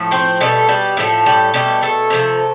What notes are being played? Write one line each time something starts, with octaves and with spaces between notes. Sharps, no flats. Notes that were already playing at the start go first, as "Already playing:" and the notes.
Already playing: A2 F3 A3
C4 C5
B2 G3 A3 A4
G3 G4
A2 F3 A3
G3 G4
B2 G3 A3 G4
A3 A4
C3 F3 A3